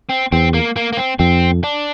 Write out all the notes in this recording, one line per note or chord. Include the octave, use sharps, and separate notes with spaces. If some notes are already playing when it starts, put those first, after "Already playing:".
C4
E2 C4
A#3
A#3
A#3
C4
F2 C4
D4